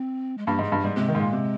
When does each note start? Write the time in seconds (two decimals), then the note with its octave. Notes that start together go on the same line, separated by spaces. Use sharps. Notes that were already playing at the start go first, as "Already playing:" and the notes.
Already playing: C4
0.38 G#3
0.47 G2 A#3
0.59 G#2
0.63 G#3
0.72 G2
0.80 G#2 G3
0.96 C3 G#3
1.08 D#3
1.15 G#2
1.20 A#2
1.33 C3